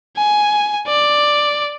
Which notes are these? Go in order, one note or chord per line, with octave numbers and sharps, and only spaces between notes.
G#5
D5